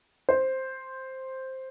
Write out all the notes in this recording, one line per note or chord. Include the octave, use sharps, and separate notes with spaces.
C5